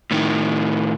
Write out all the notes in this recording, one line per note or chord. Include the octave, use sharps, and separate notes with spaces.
A2 D#3